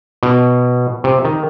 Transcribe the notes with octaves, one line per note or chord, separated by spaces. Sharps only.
B2
C3
D#3